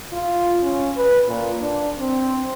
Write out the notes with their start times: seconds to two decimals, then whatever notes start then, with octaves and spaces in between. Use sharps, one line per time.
0.13 F4
0.63 C#4
0.97 B4
1.27 A#2
1.61 D4
1.99 C4